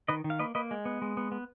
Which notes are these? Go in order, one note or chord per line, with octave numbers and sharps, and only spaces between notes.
D#3 B4 D#5
D#3
F5
A#3 B4 D#5
A#3 B4 D#5
G#3
B3
G#3
B3
B3